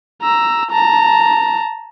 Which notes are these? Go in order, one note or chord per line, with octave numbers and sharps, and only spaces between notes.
A#5 E6
A5 A#5